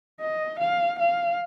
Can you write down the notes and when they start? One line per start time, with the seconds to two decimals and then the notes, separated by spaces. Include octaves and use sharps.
0.21 D#5
0.60 F5
0.99 F5